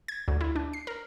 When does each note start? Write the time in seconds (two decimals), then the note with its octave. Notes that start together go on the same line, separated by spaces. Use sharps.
0.08 G#6
0.28 D2
0.41 E4
0.56 D4
0.73 C7
0.87 A#4